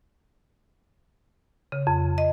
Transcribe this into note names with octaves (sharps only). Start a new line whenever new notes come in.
C#3
F2
D#5